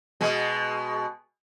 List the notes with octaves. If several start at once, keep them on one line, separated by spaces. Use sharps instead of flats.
B2 G#3